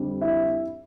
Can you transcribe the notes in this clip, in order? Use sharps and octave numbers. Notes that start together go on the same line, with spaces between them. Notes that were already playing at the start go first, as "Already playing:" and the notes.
Already playing: F2 D3 G3
E4 E5